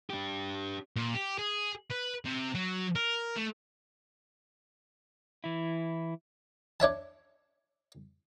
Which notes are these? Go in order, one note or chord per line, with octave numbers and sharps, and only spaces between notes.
D4 G4
A#2
G4
G#4
B4
C3
F#3
A#4
A3
E3 E4
D4 C#5 E5 A5